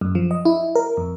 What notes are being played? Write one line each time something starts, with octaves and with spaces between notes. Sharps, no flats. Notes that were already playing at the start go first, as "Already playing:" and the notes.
F#2
F3
D#5
E4
A#4
F2